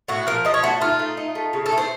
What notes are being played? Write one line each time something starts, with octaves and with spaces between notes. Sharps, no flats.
A2 F#4
F3 A#4
F3 D#5
C#5
A3 F#4
D#4 F4
A3
D#4
A3
C#3
A4
A3
C5